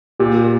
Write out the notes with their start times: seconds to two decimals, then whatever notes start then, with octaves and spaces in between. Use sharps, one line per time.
0.19 A#2 G4
0.44 A#2